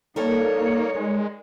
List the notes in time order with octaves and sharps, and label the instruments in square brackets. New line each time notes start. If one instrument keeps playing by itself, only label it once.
[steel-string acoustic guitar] G3 A4 A#4 [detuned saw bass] A#3 [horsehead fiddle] D#4 C#5
[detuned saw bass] G#3